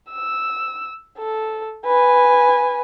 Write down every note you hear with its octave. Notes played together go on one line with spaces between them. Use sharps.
E6
A4
B4 G#5